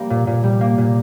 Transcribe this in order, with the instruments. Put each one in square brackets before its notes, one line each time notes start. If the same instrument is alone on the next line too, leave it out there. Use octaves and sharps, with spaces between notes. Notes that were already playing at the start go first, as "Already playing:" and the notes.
Already playing: [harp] G3 A#3
A#2
A#2
G3
A#3
A#2